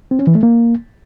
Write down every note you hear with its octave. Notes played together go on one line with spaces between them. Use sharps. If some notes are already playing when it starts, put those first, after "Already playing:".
C4
C#4
E3
A3
A#3